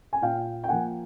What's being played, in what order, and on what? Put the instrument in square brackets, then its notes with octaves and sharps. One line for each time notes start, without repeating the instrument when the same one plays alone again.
[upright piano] G#5
A#2 F5 G5
G5
F3 A#3 F#5 G#5